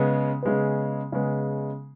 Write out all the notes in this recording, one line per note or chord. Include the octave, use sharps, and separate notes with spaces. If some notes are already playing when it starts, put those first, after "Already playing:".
Already playing: C#3 G#3 B3
C#3 G#3 B3
C#3 G#3 B3